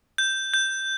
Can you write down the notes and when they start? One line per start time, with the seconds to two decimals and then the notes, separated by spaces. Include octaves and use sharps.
0.18 G6
0.54 G6